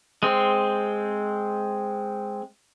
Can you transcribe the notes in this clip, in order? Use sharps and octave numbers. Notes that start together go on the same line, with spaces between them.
G#3 C4